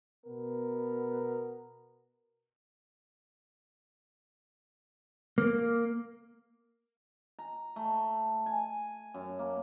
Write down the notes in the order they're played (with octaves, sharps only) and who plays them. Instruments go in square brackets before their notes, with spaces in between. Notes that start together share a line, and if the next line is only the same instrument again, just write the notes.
[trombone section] B2 B3 A#4
[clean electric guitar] A#3
[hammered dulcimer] A#5
A3
G#5
F#2
A#3